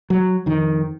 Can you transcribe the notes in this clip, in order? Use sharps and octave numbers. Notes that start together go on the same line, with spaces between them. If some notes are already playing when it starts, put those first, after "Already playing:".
F#3
F2 D#3